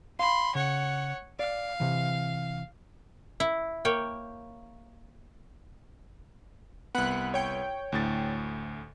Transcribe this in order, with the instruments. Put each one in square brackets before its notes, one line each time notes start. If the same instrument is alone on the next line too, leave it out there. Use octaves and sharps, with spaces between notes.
[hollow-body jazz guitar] F5 [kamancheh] B5 C6
[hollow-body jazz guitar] C#3 [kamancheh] C#5 F#5
[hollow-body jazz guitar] D5 [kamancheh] F5
[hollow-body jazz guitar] C3 E3
[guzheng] E4
A#3 C#5 G5
[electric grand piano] C2 B3 [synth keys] F#5 B5 F#6
[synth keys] C#5 G5
[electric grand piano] D2 A2 A6